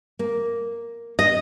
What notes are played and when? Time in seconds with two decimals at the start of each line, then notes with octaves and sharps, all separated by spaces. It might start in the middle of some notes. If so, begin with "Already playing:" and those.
0.19 A#3
1.19 D#5